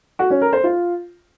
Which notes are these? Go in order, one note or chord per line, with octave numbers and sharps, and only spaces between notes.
F#4
C#4
A#4
C5
F4